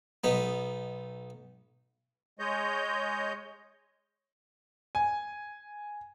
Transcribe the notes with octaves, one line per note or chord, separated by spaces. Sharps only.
B1 B3 D#4
G#3 C#5 D#5 G6
G#5